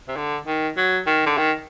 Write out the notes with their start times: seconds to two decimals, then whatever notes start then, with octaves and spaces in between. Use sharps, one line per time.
0.08 C3
0.16 D3
0.47 D#3
0.77 F#3
1.07 D#3
1.26 D3
1.37 D#3